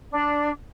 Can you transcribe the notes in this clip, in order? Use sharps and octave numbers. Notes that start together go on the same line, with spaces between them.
D4